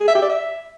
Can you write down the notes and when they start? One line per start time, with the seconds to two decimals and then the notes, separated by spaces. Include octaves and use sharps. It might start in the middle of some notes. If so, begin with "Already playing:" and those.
0.01 G#4
0.08 E5
0.15 G4
0.22 D5
0.29 E5